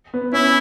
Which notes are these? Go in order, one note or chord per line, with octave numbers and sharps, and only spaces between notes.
B3
C#4 E4